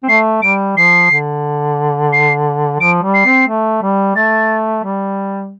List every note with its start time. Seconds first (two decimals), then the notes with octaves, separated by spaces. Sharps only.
0.03 C4
0.09 A3 C7
0.42 G3 D7
0.77 F3 C7
1.11 D3
2.13 C7
2.80 F3 D7
3.03 G3
3.14 C7
3.25 C4
3.47 A3
3.82 G3
4.16 A3 A6
4.84 G3